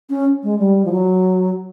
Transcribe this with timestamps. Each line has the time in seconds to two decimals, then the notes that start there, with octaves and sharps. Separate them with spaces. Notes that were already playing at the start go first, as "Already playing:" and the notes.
0.10 C#4
0.43 G#3
0.59 G3
0.85 F3
0.92 F#3